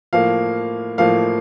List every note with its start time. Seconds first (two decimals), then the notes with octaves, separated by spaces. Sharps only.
0.13 A2 F3 A#3 F5
0.98 A2 F3 A#3 F5